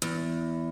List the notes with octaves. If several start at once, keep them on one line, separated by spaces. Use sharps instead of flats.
E2